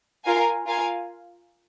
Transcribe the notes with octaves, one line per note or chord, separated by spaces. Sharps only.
F4 A#4 F5 G#5
F4 A#4 F5 G#5